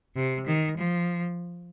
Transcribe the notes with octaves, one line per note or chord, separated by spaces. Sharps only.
C3
D#3
F3